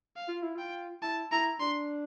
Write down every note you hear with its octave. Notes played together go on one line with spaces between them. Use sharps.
F5
F4
E4
F4 G5
E4 A5
E4 A#5
D4 C6